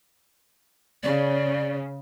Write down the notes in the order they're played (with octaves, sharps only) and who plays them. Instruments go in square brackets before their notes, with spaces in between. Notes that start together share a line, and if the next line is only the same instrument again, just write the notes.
[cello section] C#3 [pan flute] D5